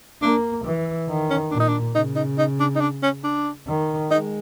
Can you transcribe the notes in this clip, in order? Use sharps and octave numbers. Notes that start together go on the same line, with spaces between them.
A#3 D4
E3
D#3
C#4
A#2 D4
D#4
D4
C#3 D#4
D#4
D#4
D4
D#4
D4
C#4
D4
D#3
G#3 D#4